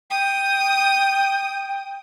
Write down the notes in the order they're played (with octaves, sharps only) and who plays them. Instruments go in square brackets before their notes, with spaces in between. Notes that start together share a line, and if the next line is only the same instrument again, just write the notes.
[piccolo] G5 [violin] D#6